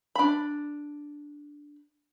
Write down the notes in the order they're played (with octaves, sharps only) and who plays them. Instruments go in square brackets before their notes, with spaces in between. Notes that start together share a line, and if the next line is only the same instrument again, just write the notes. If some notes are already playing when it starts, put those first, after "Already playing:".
[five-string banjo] D4 B5